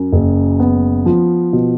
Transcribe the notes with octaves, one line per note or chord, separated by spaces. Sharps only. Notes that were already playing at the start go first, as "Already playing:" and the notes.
Already playing: F#2
F#1
B3
F3
B2